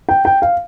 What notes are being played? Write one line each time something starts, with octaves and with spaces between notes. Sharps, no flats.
G5
G5
F5